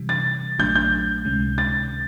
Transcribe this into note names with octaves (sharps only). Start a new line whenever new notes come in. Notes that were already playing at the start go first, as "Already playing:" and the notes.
Already playing: C3 E3 G3
A6
A#1 A#2 F#3 A3 D4 G6
G6
C#2 C3 D#3 G#3 C#4
A6